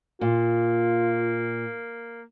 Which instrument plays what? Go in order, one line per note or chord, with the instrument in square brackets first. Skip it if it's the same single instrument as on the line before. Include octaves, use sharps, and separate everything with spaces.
[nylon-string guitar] A#2 [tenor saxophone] A#3 [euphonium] F4